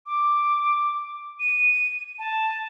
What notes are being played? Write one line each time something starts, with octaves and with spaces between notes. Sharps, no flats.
D6
D#7
A5